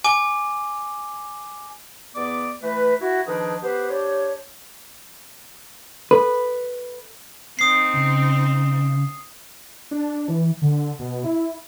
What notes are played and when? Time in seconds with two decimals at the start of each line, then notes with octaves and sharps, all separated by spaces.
0.04 G#5 D6
2.15 E2 B3 D5 D6
2.62 E3 A3 B4
3.00 E4 F#4
3.26 D#3 F3 D4 G#4 B4
3.62 B3 G4 B4 C5
3.89 D4 G4 C5 C#5
6.11 A4 B4
7.59 C4 D#4 D#6 C7
7.94 C#3
9.91 D4
10.28 E3
10.62 D3
10.99 B2
11.24 E4